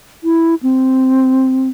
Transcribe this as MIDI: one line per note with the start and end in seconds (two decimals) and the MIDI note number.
0.24 0.55 64
0.63 1.69 60